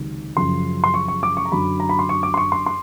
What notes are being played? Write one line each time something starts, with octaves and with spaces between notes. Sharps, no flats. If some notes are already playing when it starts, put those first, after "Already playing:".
Already playing: C#2 C3 D#3 F#3
F#2 C#3 F3 C6
C6
C#6
C#6
D6
C#6
A#5
F#2 D3 F#3 B5
A#5
B5
C6
C#6
D6
C6
C#6
C6
C6